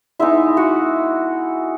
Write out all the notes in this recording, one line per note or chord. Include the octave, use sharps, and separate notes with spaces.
G#3 B3 D#4 E4 E5
F#4 F#5